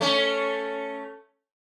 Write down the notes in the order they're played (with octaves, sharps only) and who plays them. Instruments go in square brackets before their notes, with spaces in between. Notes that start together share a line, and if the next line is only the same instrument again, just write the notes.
[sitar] A3 C#4